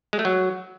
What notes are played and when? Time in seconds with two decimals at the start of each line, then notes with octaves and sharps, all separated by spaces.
0.13 G#3
0.19 A3
0.25 F#3